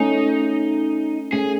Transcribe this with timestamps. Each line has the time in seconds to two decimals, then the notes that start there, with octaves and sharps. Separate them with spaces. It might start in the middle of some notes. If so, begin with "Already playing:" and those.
Already playing: A3 C#4 D#4
1.32 A3 C#4 G#4